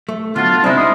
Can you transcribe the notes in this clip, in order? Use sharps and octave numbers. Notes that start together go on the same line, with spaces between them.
A3
D3 F#3 B3 D4 F4
C3 G3 G#3 C4 D#4 E4
D#5 C6 D#6